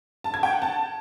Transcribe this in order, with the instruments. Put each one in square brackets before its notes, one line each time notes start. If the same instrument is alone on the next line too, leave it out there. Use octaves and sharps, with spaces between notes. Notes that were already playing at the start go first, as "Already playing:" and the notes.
[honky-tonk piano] A5
G#6
G5
F#5
A5